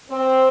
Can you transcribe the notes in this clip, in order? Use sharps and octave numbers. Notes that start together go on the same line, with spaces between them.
C4